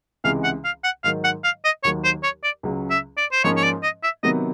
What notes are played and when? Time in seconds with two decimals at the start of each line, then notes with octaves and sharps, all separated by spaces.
0.24 C#2 C3 E3 G#3 F5
0.44 F#5
0.65 F5
0.84 F#5
1.04 G#2 D#3 F#3 F5
1.24 F#5
1.44 F5
1.64 D#5
1.83 D#2 D#3 F#3 C#5
2.04 C5
2.23 C#5
2.44 D5
2.63 C#2 C#3 F#3
2.90 E5
3.17 D5
3.32 C5
3.44 G#2 F3 A#3 C#4 C#5
3.57 C#5
3.63 D5
3.83 D#5
4.03 E5
4.23 C3 D#3 F#3 B3 D#5